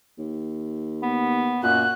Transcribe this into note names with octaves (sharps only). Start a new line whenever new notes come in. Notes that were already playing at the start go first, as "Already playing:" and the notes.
D#2
B3
F#2 A#2 F#4 F#6